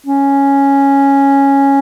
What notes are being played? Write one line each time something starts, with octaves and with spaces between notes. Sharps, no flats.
C#4